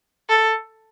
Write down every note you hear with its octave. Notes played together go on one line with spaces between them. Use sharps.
A4